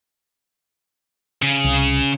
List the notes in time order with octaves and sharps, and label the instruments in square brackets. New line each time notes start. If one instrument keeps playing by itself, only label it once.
[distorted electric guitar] C#3
[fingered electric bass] C2